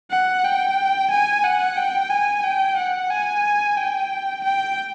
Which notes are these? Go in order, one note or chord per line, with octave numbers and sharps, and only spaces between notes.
F#5
G5
G#5
F#5
G5
G#5
G5
F#5
G#5
G5
G5